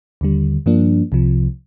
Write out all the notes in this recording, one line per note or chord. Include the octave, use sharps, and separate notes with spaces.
D#2 D3 G3
G2 F3 A#3 D4
C2 C3 F3